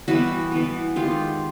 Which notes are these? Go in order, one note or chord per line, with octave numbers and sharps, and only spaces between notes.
E3 G3 B3 E4 F#4
E3 G3 B3
D#3 G#3 B3 F4 G4